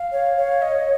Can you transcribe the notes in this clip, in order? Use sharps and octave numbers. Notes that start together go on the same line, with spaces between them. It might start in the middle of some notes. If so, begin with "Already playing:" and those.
Already playing: F5
C#5
C#5
D#5